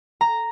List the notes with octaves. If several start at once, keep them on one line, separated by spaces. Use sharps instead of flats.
A#5